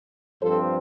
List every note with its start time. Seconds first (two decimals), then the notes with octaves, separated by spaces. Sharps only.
0.42 G2 F3 C4 A4 C5